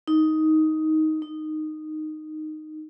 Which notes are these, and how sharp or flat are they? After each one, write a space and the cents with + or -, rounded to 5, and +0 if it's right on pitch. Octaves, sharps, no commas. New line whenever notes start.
D#4 +10
D#4 -10